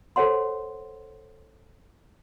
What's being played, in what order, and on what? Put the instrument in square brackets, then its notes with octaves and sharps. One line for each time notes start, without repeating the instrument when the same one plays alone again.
[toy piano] A4 C5 C#5 F#5 C6